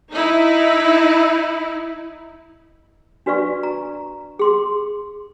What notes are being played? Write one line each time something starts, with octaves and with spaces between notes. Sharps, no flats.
D#4 E4
D4 F#4 B4 D5 F5 C#6
A#5
G#4 C6 D6